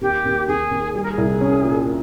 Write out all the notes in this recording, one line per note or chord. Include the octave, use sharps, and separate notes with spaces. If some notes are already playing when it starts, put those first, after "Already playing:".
D#2 G4
D#2
D#2 G#4
D#2
G3 G#4
A#4
G#4
C2
C#4
A#2